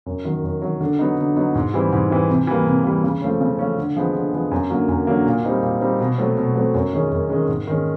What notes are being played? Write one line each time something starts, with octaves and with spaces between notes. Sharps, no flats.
F#2
D#3 F#3
F#2
D#3 F#3
D3
F#3 B3 D#4
D3
F#3 B3 D#4
G#2
E3 G3 C4 E4
G#2
E3 G3 C4 E4
C3
E3 G3 A#3
C3
E3 G3 A#3
C#3
F3 A3 C#4
C#3
F3 A3 C#4
D3
F3 G#3 B3
D3
F3 G#3 B3
F#2
D3 F#3 A#3
F#2
D3 F#3 A#3
A#2
G3 C4 D#4
A#2
G3 C4 D#4
B2
F#3 A3 C4
B2
F#3 A3 C4
F#2
D#3 G#3 C#4
F#2
D#3 G#3 C#4
G#2
D#3 G#3 C#4